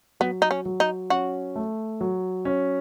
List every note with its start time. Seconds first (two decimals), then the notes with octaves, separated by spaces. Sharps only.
0.20 F#3 B3
0.42 D#4
0.51 C#4
0.65 F#3
0.80 D#4
1.10 C#4 F#4
1.56 A3
2.01 F#3
2.45 C#4